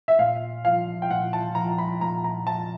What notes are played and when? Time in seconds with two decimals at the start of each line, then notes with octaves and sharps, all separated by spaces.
0.08 E5
0.19 A#2 F5
0.65 F3 F5
1.02 G5
1.10 A#2 F#5
1.33 A5
1.55 F3 A#5
1.78 B5
2.01 A#2 A#5
2.24 A#5
2.46 F3 A5